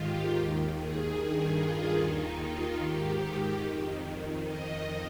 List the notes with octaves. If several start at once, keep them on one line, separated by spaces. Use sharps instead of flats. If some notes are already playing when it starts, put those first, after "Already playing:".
Already playing: G#2 D#3 F4 G4
D#2 D#3
G#4
G2 D#3 G#4
F4
D#2 D#3 D#4
F4
G#2 D#3 G4
F2 D#3
F2 D#3 D#5